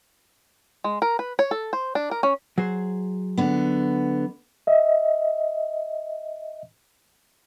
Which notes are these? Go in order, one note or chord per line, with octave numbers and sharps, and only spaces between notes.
G#3
A#4
B4
C#5
A4
C5
D4
A#4
C#4
F#3 G#4 C5
D3 B3
D#5 E5